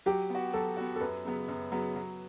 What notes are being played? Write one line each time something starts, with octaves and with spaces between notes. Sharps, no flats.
F#3 G4
B3 F#4
F#3 A4
B3 F#4
A4
F#2 B4
C#3 F#3 B3
F#2
C#3 F#3 B3
F#3